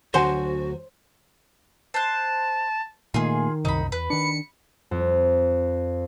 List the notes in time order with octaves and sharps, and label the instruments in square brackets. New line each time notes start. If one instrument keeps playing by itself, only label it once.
[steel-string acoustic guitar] D2 F#3 [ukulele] D4 F#5 G#5 [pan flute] F#4 [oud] C5
[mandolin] C5 F#6 [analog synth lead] A5
[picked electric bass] A#2 A3 A#3 [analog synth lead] D#3 [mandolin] F4 G#4
[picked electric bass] C2 F#2 C3 [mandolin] D#4 B5
[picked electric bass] E2 [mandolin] B4
[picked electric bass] D#3 D4 [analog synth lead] C#7
[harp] F2